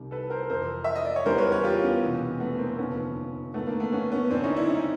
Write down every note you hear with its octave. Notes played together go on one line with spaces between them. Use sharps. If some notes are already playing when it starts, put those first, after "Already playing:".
Already playing: C2 C3 D#3 G3
A4 B4
A#4 C5
F2 C3 E3 A#4 C5
E5
D#5
D5
C#5
E2 C#3 E3 G3 A#4 C5
B4 C#5
B4 C#5
F4 G4
B3 C#4
E1 E2 C3 E3
A3 B3
A#3 C4
F1 D#2 D3 F3 B3 C#4
G1 F#2 D#3 A3 B3
A#3
A3 B3
B3 C#4
B3 C#4
F#1 F#2 D3 C4 D4
C#4 D#4
D4 E4
C#4 D#4